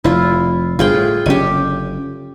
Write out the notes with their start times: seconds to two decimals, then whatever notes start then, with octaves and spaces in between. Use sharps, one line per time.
0.04 F1 E4 F4
0.79 G1 F4 G#4 G5
0.94 A2
1.26 F#1 D3 C#4 G4 G#5